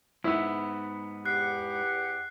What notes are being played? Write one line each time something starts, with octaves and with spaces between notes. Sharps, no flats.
G#2 B3 E4
E2 G4 F#5 F#6 C7